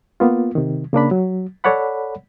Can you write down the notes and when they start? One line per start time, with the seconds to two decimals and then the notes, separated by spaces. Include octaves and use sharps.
0.20 A#3 B3 F4
0.55 C3 D#3
0.93 C#3 A#3 D4 B5
1.11 F#3
1.64 A4 C#5 D5 F#5 B5